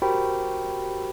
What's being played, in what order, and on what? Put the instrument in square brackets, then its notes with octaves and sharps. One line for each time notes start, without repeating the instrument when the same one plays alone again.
[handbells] F#4 G4 A#4 C5 G5 B5